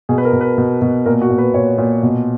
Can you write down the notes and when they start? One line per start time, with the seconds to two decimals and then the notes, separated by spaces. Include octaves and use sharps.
0.09 B2 G#4
0.18 B4
0.25 A#4
0.33 B2
0.41 B4
0.58 B2
0.82 B2
1.06 A#2 A#4
1.21 F#4
1.30 A#2
1.38 B4
1.54 A#2 C#5
1.78 A#2
2.03 B2